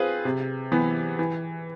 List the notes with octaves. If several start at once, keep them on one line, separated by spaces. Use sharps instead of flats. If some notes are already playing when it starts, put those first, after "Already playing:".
Already playing: C4 F4 G#4 B4
C3
E3 B3
E3